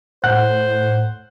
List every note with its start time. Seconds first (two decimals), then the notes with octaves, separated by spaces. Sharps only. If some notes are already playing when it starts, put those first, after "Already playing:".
0.24 A2 C5 F#5 F#6